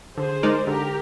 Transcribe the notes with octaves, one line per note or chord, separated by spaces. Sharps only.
D3 G#4 C5
G#3 D#4 A#4 D5
D3 G4 A#4